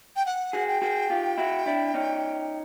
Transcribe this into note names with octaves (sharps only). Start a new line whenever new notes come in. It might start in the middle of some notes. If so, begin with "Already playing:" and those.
G5
F#5
F#4 G#4
G5
F#4 G#4
F4 G4
E4 F#4
D4 E4
C#4 D#4